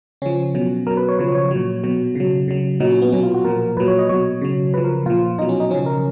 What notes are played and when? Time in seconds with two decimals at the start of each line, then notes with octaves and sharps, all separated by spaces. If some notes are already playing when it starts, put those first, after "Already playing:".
0.22 C#3 F3 C#4
0.55 B2 F#3
0.87 F#3 A#4
0.90 B2
0.97 B4
1.09 C#5
1.19 C#3 F3 C#5
1.35 C#5
1.51 A#2 F#3
1.84 B2 F#3
2.15 C#3 F#3
2.48 C#3 F#3
2.80 A#2 F#3 D#4
2.91 C#4
3.02 B3
3.12 B2 F#3 C#4
3.23 F4
3.34 F#4
3.45 A#2 F3 A#4
3.77 A#2 F#3 B4
3.88 C#5
3.99 D#5
4.09 B2 F#3 C#5
4.41 C#3 F#3
4.74 C#3 B4
4.77 F3
4.84 A#4
5.06 A#2 F3 F4
5.38 B2 D#4
5.42 F#3
5.49 C#4
5.60 D#4
5.70 C#3 F3 C#4
5.86 A#4